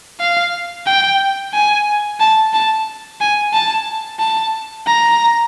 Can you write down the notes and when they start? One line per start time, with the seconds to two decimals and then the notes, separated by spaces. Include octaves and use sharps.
0.20 F5
0.87 G5
1.54 G#5
2.20 A5
2.53 A5
3.21 G#5
3.53 A5
4.19 A5
4.87 A#5